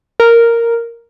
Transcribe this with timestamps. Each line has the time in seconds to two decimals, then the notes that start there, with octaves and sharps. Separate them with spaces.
0.20 A#4